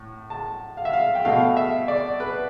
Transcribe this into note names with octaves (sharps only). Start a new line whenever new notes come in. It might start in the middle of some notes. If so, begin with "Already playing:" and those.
Already playing: A2
A5
F5
E5
F5
G5
B2 A3 F5
E5
D5
B4